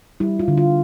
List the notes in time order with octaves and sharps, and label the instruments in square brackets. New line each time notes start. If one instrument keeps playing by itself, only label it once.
[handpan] G3 E4
F4
D3
F4